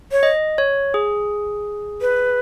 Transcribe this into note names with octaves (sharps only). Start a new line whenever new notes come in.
C#5
D#5
C#5
G#4
B4